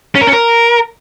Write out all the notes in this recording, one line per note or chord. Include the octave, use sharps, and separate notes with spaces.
C#4
A#4
C#4
A#4